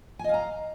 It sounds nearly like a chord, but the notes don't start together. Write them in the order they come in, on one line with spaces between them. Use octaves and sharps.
G#5 D#5 F5 A#5